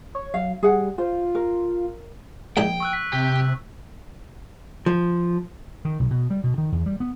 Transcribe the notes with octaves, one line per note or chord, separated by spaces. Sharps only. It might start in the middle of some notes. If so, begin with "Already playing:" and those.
C#5
F#3 F5
G3 G#4 F#5
F4 C5
A#4
A#1 G#2 E4 G5
C#6 E6 F#6
B6
C3 G4
F3
D#3
B1
B2
G3
B2
D#3
E2
G3
B3